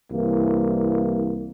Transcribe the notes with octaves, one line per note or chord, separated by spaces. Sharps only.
C2 E3 A#3